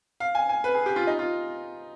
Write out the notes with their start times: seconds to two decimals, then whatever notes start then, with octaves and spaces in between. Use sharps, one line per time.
0.20 F5
0.35 G#5
0.49 G#5
0.64 B4
0.74 G#4
0.86 G4
0.96 F4
1.07 D#4
1.19 F4